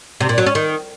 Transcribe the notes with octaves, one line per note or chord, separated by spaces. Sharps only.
C3
A#2
F#3
C#4
D#3